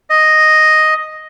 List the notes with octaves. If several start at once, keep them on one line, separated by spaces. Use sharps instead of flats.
D#5